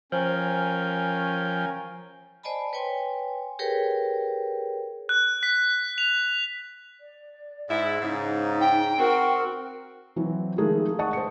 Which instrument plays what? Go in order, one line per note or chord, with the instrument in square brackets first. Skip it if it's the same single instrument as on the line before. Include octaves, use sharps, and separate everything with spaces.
[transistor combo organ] F3 G5 [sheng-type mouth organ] C#4 A#4 G#5 [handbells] C5
[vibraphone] C5 D5 D#5 G#5 A5 B5
B4 C#5 G5 G#5 C6
G4 G#4 A#4 B4 C#5 G5
[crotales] F#6
B6
F7
[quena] D5
[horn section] G#2 E4
[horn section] G#2 C#3 [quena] D#4
[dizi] G5
[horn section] C4 F#4 [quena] A#4
[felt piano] E3 F#3 C4
D#3 F3 G#3 A3 G#4 A#4
D#5 F#5 A5 C#6 D#6
C5 C#7